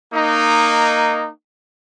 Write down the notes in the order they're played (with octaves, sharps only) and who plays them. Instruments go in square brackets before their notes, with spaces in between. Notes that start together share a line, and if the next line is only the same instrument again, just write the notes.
[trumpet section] A#3 D#4